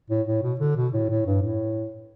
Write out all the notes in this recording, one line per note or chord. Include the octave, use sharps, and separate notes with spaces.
A2
A2
B2
D3
B2
A2
A2
G2
A2